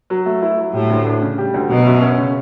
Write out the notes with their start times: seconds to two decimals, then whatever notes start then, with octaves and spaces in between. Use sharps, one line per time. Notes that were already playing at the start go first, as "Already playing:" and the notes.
0.10 F#3
0.26 A3
0.42 E4
0.58 F#3
0.74 A2 G3
0.90 D2
1.06 D4
1.22 C#3
1.38 G3
1.54 D2
1.70 B2 F#3
1.87 F#2
2.02 C#4
2.18 C#3